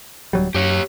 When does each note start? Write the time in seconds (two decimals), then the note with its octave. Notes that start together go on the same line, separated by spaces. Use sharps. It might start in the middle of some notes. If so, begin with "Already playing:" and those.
0.33 D1 F#3 G3
0.55 F#2 G4 C#5